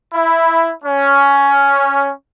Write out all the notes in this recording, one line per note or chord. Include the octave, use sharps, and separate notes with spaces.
E4
C#4